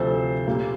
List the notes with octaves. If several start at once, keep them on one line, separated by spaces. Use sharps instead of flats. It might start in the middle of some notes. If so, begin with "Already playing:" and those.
Already playing: D2 C3 F3 A4 C5
A#2 G3 A#3